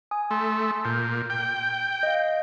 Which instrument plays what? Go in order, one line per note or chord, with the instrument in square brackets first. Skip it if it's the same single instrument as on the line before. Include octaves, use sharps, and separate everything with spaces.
[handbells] G#5 D#6
[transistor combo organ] A3 [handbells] C6
[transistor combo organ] A#2 [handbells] G6
[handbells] G6
[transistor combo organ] G5
[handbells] D#5 F5